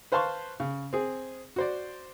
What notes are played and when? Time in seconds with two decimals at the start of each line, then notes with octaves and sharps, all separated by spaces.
0.12 B4 C5 F5 A5 C6 C#6
0.60 C#3
0.93 C4 G#4
1.56 F#4 C5 D5